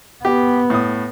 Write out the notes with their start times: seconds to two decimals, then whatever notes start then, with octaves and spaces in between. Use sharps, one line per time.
0.25 B3 G4
0.70 A2 D#6